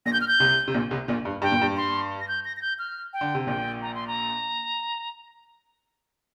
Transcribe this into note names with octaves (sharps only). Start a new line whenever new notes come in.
A#1 A#2 A#6
G6
F6
G6
C2 C3
C3
A#1 A#2
C2 C3
A#1 A#2
G2
G2 G5
A#2
G2
C6
A#6
G6
A#6
A#6
G6
F6
G5
D3
C3
A#1 A#2 G5
A#5
C6
A#5